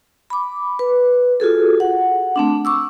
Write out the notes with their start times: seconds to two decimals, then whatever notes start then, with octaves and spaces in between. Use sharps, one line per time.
0.30 B5 D6
0.79 B4
1.40 F4 F#4 G#4 A4
1.80 F#5
2.36 A3 C4 D4
2.65 C#6 D6 E6